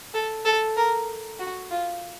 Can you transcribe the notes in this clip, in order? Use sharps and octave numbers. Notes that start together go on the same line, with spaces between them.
A4
A4
A#4
F#4
F4